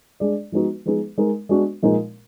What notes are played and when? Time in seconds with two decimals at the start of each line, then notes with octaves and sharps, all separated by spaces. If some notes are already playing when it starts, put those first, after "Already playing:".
0.20 G#3 D4 G#4 D5
0.52 F3 G#3 B3 D#4 F#4
0.85 F3 G#3 B3 D#4 G#4
1.18 G#3 D#4 A#4
1.49 G#3 B3 D4 F#4
1.83 A#2 F3 G#3 D#4 A#4